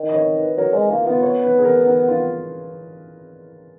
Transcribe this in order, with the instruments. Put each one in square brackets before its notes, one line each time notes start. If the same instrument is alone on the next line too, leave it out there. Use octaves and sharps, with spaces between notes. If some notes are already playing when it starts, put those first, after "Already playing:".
Already playing: [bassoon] D#3
[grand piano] D#5
C#5
B4
[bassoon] F#3 [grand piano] A#4
[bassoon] G#3
[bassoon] A#3 [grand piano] F4
[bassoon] B3 [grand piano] F4
[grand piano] C#5
B4
G#4
A#4
A#4
F4